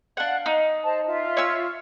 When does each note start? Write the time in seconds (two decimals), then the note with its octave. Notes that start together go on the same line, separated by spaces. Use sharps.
0.17 D4 F5 F#5
0.46 D#4
0.84 C5 D#5 A5
1.07 F4 E5
1.37 C#5 E6